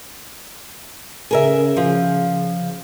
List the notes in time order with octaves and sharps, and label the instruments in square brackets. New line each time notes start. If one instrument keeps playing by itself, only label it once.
[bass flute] C#3 [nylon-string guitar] G#4 A#4 E5
[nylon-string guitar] F3